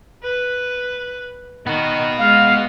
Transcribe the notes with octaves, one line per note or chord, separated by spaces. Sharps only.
B4
D#3 B3 F#4
G#3 F5